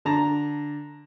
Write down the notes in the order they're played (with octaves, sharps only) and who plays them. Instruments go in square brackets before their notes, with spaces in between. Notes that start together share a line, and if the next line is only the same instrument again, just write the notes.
[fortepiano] D3 A5 A#5